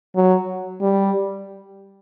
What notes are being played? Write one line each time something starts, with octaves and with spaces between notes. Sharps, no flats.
F#3
G3